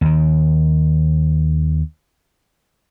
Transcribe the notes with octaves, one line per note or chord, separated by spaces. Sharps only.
D#2 D#3